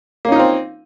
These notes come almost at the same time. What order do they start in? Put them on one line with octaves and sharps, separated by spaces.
A#3 C#4 D#4 F4 C4